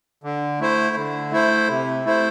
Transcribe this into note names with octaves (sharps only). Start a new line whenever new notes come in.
D3
A3 E4 C5
D3
A3 E4 C5
C3
A3 E4 C5